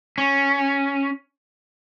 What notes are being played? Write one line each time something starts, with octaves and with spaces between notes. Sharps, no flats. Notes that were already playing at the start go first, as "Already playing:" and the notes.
C#4